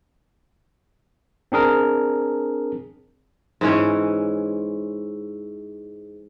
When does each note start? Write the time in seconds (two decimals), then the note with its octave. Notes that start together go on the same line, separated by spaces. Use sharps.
1.52 C4 D4 G#4 A#4
3.61 G#2 E3 C#4